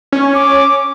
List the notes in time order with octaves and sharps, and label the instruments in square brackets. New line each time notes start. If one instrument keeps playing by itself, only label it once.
[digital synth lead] C#4
[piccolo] D6